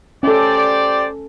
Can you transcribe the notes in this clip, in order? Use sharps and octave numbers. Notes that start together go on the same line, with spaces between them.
C#4 G4 A4 C5 D5